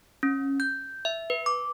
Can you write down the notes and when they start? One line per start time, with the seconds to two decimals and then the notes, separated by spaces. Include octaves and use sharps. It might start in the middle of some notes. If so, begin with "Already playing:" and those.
0.23 C#4
0.60 G6
1.05 E5
1.30 B4
1.46 D6